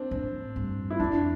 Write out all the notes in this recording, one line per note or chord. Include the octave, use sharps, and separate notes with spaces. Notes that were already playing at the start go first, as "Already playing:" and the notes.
Already playing: C4 D4
A2
G2
E4
F2 D4